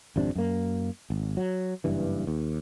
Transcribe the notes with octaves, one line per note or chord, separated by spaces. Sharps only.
G#1 F2 C3 D4
F#2 A#3
G#1
F#3
F#1 G2 E3
D#2